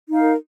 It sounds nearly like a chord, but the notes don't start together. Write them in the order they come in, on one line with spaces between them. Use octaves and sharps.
D#4 F5 A#4